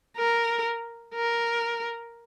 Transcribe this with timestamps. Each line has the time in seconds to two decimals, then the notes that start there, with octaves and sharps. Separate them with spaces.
0.17 A#4
1.15 A#4